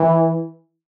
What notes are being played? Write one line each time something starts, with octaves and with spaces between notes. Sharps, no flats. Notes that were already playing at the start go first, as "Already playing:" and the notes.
Already playing: E3